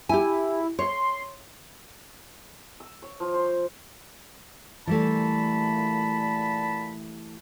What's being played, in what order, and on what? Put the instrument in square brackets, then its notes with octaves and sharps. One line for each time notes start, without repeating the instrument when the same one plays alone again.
[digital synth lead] E4 [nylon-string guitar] G4 G#5
[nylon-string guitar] C#5 [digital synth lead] C6
[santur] E6
C#5
F3
C5
[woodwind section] A#2 A5 B5 [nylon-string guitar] E3 G3 A3